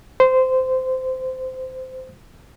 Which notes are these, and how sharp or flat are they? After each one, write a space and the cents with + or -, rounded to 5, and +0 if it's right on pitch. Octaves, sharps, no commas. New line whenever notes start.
C5 -15